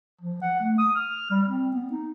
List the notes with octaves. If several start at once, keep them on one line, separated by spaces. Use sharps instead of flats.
F3
F#5
A3
D#6
F6
G3
C4
B3
D#4